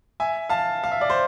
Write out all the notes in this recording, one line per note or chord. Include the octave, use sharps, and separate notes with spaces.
E5 G#5
F5 A5
F5
E5
D5
C5